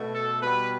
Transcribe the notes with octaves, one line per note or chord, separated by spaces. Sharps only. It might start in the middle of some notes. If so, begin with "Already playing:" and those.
Already playing: B2 A3
A4
B2 G3 B3 B4